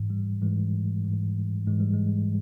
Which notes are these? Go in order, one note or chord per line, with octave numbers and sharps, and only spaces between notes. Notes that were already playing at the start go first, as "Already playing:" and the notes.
Already playing: G#2 E3
G3
G#2 E3 G#3
G#2 E3
G#2 E3 G#3
G3
G#3